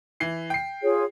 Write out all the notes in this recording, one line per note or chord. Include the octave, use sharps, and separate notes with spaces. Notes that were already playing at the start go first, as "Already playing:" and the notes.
E3 C7
G5 C7
F4 G#4 C#5